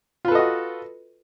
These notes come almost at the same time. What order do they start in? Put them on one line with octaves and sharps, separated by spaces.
F4 B4 A4 D#5 F#4